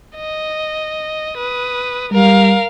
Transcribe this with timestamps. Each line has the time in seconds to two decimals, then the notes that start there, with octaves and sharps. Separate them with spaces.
0.16 D#5
1.35 B4 D#6
2.12 G3 A#4 F5